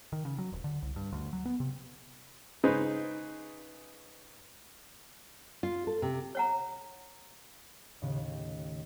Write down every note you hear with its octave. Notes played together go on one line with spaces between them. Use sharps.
D#3
C#3
F#3
D#1
D3
C2
G2
D2
F#3
B3
C3
C#3 G#3 D#4 G#4 B4 C5
F4
A4
C3
C#5 F#5 A#5
D#2 A2 C#3